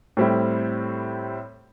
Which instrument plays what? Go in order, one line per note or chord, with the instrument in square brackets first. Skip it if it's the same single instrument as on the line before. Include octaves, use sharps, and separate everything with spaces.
[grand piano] A2 G3 C4 E4